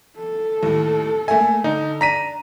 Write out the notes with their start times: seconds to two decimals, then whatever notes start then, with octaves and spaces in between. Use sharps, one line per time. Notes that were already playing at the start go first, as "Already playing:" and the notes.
0.17 A4
0.63 D#2 A2
1.28 A3 A#3 E5 G#5
1.64 D3 D#4
2.01 D4 A#5 B6 D#7